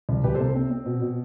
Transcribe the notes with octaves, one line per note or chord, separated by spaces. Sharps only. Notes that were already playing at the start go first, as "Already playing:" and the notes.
C2
C2 G4 B4
A4 C5
C3
C4
C4
B2
B2